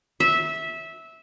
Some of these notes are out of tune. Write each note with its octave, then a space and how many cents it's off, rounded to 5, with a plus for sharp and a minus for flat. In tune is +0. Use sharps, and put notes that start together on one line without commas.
E5 -15